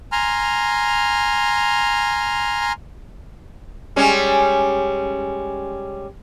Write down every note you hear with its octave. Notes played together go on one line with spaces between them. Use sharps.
G#5 A#5 C6 F6
G3 G#3 C#4